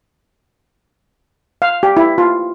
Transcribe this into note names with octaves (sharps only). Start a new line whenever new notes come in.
F5
G4
E4
F4